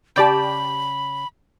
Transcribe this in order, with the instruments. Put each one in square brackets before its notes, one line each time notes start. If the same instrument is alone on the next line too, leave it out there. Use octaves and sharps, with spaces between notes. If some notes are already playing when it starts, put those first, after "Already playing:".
[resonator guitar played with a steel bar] C#3 A5 [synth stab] G4 D5 G5 [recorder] B5